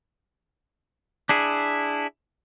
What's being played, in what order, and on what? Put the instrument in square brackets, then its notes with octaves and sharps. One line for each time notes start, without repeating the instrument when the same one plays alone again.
[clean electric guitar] D4 E4 G#4